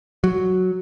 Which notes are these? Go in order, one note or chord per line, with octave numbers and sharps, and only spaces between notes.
F#3